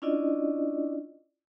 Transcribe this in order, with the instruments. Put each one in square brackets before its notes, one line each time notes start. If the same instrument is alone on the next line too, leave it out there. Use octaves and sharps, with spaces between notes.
[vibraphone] C#4 D4 E4 F4 D5 D#5